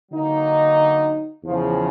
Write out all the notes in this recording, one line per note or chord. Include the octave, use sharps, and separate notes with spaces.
D3 F#3 A#3 D#4
E2 C#3 F3